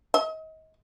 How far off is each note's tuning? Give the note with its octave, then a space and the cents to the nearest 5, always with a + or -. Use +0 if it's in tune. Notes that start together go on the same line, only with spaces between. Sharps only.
D#5 +35